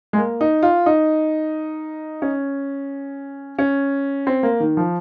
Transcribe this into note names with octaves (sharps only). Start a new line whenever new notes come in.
G#3
A#3
D#4
F4
D#4
C#4
C#4
C4
A#3
D#3
F3